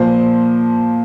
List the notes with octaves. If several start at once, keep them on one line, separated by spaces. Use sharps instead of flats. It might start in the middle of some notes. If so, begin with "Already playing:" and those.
Already playing: A#2 F3 C5